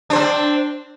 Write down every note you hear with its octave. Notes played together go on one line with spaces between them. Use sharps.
C4 D4 C5